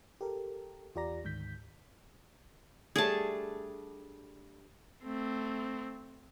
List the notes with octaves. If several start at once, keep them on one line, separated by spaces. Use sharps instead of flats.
G4 A4 A#4
E2 F4 G4 D5 A#5 A#6
D2 G#2 D#3 G6 B6
G3 A3 D4 G#4 A5
A3 C4